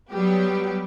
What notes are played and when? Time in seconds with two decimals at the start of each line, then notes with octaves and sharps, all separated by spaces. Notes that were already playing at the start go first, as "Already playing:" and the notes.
0.11 F#3 G3 B3 G4